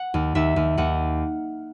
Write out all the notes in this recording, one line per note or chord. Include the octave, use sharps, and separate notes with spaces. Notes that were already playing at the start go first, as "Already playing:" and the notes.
Already playing: F#5
D#2
D#2 E5
D#2
D#2 F#5